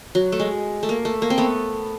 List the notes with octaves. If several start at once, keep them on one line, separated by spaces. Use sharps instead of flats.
F#3
A3
G#3
A3
A#3
A3
A#3
C4
A3 B3